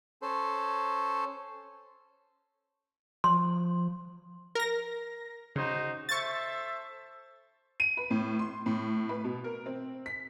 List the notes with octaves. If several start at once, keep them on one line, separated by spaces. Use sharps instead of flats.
C#4 A4 C5
F3 C6
A#4 A#6
C#3 D#4 F#4 C5
A4 C5 E5 C#6 A6
D#7
B4
A2
C6
A2
B4
B2
A#4
C4
B6